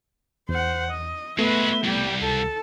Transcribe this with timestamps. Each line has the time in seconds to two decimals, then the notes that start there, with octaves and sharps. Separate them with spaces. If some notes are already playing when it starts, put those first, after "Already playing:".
0.49 E2 C5 F#5
0.90 D#5
1.39 G#3 A3 B3 F#4 B4 E5
1.84 C2 G3 G4
2.21 C#2 A4 A5